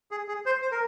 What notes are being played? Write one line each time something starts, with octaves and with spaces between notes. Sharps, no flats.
G#4
G#4
C5
C5
A#4